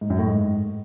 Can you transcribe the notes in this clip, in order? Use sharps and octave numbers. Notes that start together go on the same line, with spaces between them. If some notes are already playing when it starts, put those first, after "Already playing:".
G#2
F#2
A2
G#2